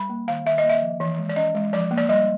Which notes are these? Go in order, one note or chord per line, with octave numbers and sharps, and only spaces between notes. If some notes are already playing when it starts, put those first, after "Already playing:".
Already playing: G3 B5
A#3
D#3 F5
D#3 E5
D#5
A#3
E5
F3
E3
G#3
D5
C#4 D#5
G#3
F3 D5
A#3
D5
G3 D#5